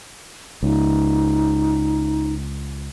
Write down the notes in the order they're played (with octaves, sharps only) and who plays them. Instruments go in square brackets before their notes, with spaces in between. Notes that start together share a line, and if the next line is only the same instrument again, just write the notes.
[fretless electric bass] C#2 [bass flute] D#4